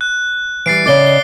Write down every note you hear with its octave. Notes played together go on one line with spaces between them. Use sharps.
F#6
E3 G3 A6 C7 D7
C#3 D5 D#5 D6 A6 G7
G7